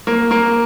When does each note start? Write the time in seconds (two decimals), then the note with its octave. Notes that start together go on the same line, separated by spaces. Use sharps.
0.07 A#3
0.31 A#3